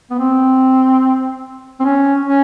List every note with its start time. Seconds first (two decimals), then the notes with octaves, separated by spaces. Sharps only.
0.10 B3
0.18 C4
1.80 C4
1.84 C#4
2.26 C#4